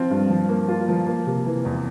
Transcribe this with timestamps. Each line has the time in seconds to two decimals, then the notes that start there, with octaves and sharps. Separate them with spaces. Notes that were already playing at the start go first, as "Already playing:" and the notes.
Already playing: F3 C4 F4
0.10 G2
0.30 F3
0.49 A#3
0.68 F4
0.88 F3
1.07 A#3
1.27 C3
1.46 E3
1.65 E2